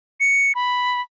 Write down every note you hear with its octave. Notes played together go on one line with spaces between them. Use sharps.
C#7
B5